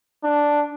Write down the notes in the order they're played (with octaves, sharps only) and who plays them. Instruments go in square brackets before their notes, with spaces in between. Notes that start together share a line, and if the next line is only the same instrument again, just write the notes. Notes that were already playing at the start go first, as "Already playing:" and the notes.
[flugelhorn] D4